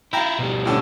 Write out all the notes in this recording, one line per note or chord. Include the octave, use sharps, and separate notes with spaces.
E4 F4 G5 A#5
B2 G3
A2 D3 C#4